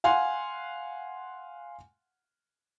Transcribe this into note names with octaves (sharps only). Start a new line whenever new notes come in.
F5 F#5 G#5 C6